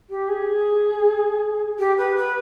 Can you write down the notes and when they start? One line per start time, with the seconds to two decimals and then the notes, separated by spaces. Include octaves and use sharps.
0.10 G4
0.28 G#4
1.79 G4
1.97 B4
2.16 B4